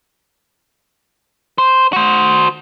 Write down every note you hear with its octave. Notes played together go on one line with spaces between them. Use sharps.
C5
F#4 C5